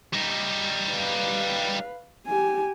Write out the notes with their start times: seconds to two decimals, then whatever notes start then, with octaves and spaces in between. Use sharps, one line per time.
0.13 G3 D#4
0.90 B4 F5
2.27 G4 G#5